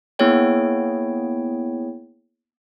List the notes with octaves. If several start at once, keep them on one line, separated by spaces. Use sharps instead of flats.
A#3 B3 E4 G#4 C#5 G5